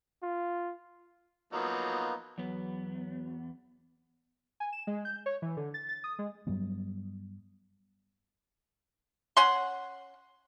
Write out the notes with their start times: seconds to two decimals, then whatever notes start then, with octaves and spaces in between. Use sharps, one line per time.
0.23 F4
1.53 F3 F#3 A#3 B3 D#4
2.38 E2 F#3 B3
4.60 G#5
4.72 E7
4.87 G#3
5.05 G6
5.26 C#5
5.42 E3
5.57 D3
5.74 A6
5.89 A6
6.04 D#6
6.19 G#3
6.47 G2 F#3 G3 B3
9.37 C#4 F#5 C6